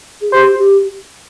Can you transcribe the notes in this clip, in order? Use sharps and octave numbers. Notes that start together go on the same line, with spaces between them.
G#4
G4 C5
G4